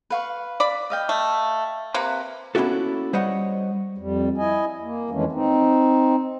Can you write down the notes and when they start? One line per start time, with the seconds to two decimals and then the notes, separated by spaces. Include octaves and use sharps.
0.10 B4 F5 C#6
0.60 D5 B5
0.90 D#5 F5 G5
1.09 A3
1.94 C3 A#3 B4
2.55 A#3 B3 C#4 E4 F#4 A4
3.13 G3 C5 C#5 D#5 F#5
3.98 F2 G3
4.38 E4 D#5 G#5
4.82 A#3
5.11 F2 D#3 E3 G#3 A3 C#4
5.32 C4 D#4